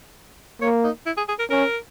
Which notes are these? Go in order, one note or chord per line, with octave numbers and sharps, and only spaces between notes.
A#3 C#5
D#4
E4
G#4
G#4
A#4
C#4 A#4